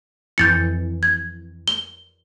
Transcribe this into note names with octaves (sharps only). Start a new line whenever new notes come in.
F2 E3 G6 A6 C#7
G#6
G7